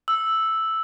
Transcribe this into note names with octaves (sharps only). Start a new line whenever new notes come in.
E6